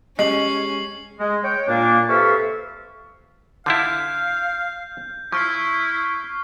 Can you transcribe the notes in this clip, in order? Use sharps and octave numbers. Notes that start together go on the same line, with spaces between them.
G#3 C#4 G4 D#5 C7 F#7
G#3
C#5 G5
A#2 A#3 D4
C3 A4 B4 E5 F5 C#6
D3 D4 E4 F5 G6
F3 E4 C#6 F6 C7